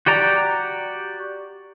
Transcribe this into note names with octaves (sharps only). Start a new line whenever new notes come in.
F#4 G4 D5 A#5